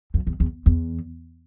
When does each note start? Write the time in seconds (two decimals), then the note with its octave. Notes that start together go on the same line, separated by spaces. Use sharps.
0.14 F2
0.27 E2
0.40 E2
0.66 E2